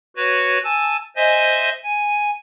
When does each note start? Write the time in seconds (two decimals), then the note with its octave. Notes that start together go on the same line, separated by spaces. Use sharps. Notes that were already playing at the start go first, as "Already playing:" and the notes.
0.16 F#4 B4 C#5
0.64 G#5 A5 E6
1.16 C5 D#5 E5 G#5
1.84 G#5